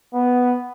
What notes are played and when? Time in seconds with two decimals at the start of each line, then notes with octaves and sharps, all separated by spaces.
0.14 B3